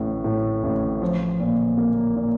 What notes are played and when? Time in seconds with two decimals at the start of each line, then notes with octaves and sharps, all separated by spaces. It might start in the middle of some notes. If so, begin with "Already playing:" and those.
Already playing: A1 A2
0.24 A2
0.63 A1
1.02 F3
1.40 A#2
1.78 A#3
2.16 A#2